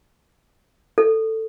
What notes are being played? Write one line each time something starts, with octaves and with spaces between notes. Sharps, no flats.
A4